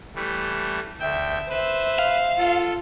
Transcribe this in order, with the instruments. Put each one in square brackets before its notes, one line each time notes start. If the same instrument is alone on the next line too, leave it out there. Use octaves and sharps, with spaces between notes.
[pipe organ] E3 G3 A3
[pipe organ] D2 G5 [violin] E5
[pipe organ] B4 [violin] C5 E5
[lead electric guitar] F5
[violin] F4 [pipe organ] A4